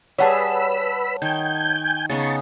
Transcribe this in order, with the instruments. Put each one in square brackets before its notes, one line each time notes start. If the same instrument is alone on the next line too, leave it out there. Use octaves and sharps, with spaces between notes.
[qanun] G3 G#4 [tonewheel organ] B4 B5 E6 [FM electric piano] C#5 F#5 A5
[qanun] D#3 [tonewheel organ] G5 G#5 G6
[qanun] C#3 B3 D#4 [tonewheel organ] A5 C#6